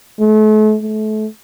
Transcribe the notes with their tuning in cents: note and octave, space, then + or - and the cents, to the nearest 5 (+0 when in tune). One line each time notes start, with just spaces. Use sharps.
A3 -40
A3 -30